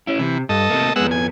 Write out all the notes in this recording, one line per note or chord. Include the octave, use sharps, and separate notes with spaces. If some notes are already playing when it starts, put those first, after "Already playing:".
C#4 E4
C3 E3
G2 A4 D#5
C3 A3 A#3
F2 G#3 B3 F#5 E6
G#5